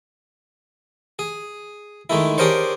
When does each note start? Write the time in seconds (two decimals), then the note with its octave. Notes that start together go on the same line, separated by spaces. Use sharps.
1.19 G#4
2.10 D#3 G#3 A3 E4
2.38 D4 G4 G#4 A#4 C5 C#5